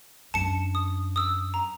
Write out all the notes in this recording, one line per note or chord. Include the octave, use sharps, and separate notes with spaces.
F#2 D4 A5 C#7
D#6
D#6 E6
A#5